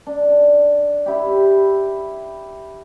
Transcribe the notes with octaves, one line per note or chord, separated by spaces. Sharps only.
D4
E4 G4